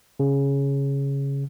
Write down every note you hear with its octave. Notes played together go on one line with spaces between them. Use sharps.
C#3